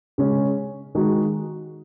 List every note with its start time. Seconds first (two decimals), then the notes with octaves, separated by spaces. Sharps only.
0.18 C#3 G#3 C#4
0.95 D#3 G#3 D#4 F#4